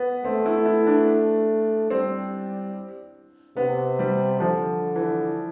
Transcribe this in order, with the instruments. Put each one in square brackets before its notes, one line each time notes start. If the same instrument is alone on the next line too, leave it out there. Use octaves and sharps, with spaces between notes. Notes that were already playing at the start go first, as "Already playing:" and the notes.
Already playing: [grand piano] B3
[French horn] A3 [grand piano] C4
[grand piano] E4
E4
D4
[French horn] G3 [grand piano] C4
[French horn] C3 [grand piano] B3
[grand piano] G3
[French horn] D3 [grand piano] F3
[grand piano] E3